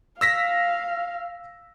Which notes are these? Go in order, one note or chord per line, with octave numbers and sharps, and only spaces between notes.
F5 E6 A#6 B6